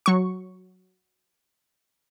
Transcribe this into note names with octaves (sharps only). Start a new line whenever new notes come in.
F#3 C#6